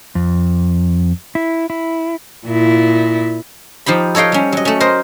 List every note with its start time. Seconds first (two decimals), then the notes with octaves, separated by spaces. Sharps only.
0.15 F2
1.35 E4
1.70 E4
2.47 A#2 E4
3.86 F3 D#4 G4 B5
4.15 A4 C#5 D#5 F5 G5
4.32 G3 C#4
4.52 F#3 D#5
4.65 A3 C#4
4.80 A#4 C5 D#5